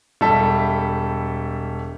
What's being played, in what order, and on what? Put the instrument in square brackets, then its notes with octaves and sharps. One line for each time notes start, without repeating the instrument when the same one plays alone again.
[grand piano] E1 G3 A4 E5 A5